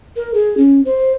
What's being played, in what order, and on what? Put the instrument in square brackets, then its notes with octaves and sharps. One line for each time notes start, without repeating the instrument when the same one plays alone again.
[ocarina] A#4
G#4
C#4
C5